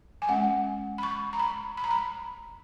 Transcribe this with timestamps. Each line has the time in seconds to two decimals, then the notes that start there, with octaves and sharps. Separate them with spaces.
0.22 G#5
0.29 G#3 C#4 F#5
0.98 B5
1.03 C#6
1.33 A#5
1.39 B5
1.77 B5
1.84 A#5
1.91 B5